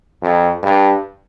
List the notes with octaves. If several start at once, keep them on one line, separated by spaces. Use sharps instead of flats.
F2
G2